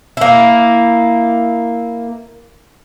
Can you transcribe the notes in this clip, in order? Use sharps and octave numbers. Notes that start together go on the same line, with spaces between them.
A#3 E4